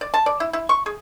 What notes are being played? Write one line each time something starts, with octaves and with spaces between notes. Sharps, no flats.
D5
A5
D5
E4
E4
C#6
G#4